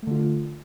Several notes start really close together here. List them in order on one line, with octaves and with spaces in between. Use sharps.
A3 D3 F4